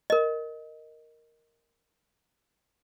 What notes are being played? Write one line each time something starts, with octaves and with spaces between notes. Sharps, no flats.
A#4 D#5